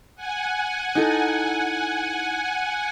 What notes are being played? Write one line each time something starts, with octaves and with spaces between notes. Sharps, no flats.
F#5 G#5
D#4 E4 A4